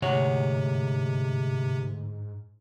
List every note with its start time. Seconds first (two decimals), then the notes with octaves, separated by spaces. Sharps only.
0.02 D2 G#2 C3 C#5 F#5